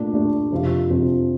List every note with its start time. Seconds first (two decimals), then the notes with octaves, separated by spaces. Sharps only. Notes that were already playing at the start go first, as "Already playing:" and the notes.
Already playing: A#2 A3 D4
0.13 A#2 A3 D4
0.52 F2 C3 F3 C4 F4
0.90 F2 C3 F3 C4 F4